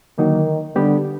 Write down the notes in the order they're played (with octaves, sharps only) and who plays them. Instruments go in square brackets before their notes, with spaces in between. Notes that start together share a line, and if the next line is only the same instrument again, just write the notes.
[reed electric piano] D3 F#3 A#3 D#4 [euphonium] D#3
[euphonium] D3 [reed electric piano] G3 B3 D4 G4